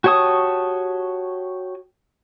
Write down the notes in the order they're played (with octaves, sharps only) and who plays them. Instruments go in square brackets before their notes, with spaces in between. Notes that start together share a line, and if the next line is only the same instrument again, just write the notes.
[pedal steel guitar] F#4 G4 C#5 A5 D#6